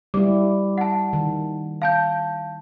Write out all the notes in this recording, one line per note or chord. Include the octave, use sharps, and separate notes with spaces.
G3 E4 D6
F#5 A5
D#3
F5 A5 G6